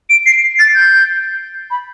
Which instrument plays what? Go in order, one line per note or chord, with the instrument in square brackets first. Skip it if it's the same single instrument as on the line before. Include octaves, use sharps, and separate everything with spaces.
[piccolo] D7
C7
A6
G6
B5